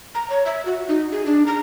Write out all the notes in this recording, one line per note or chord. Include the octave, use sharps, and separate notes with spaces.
A#5
C#5
E5
F#4
D#4
G#4
D4
A#5